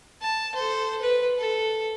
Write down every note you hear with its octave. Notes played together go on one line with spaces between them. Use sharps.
A5
A4 C5
B4
A4